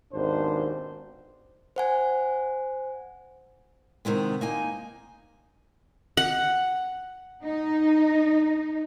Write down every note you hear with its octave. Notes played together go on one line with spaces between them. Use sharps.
G#1 D#2 B2 D4 C5
C5 F#5 G#5
C3 D#3 G#3 B3
A#3 D#4 G#5
F#5
D#4